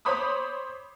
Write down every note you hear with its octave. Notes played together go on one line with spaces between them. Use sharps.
C5 C#5 B5 D6 D#6